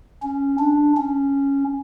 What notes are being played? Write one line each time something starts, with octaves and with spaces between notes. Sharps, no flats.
C#4
D4
C#4